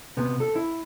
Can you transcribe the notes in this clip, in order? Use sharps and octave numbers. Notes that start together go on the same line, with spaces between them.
C3 B3
A4
E4